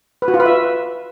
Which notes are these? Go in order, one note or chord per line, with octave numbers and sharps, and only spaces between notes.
B4
F#4
F4
B4
E5